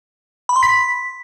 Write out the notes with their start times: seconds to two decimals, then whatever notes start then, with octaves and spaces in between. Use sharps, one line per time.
0.49 B5
0.56 C6
0.63 B6